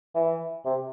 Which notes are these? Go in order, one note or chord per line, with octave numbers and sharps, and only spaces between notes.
E3
C3